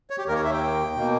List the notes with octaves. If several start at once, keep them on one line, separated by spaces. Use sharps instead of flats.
C#5
G4
D#2 D#3 A#3 A#4
C#5
E5
G5
B2 A#3